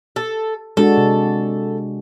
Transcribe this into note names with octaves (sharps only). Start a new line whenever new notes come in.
A4
G#3 D4 F#4 A4
C3